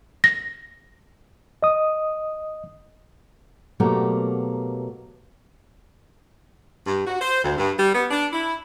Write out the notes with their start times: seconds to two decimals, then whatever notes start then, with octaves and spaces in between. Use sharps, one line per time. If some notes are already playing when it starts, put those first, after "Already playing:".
0.24 A#6
1.63 D#5 D#6
3.80 B2 F#3 A3 A#3 G4 A#5
6.87 G2
7.07 F#4
7.21 C5
7.44 D2
7.58 G2
7.79 G3
7.94 B3
8.11 D4
8.33 E4